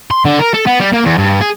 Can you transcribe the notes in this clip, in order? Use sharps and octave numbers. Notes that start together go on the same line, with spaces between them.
C6
D3
A#4
A4
B3
G3
A#3
E2
G2
G#4